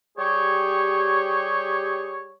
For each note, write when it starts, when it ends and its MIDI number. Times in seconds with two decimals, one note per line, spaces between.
0.18 2.32 55
0.18 2.32 67
0.18 2.32 68
0.18 2.32 73